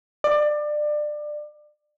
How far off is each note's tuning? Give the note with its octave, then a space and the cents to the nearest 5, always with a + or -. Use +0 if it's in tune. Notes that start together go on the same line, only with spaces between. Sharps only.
D5 +25